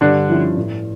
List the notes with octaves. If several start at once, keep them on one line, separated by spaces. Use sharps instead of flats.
G2 D3 D4
F3 C#4 E4
A2